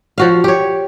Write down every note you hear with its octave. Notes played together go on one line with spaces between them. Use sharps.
F3 F#4 F5
G4 C#5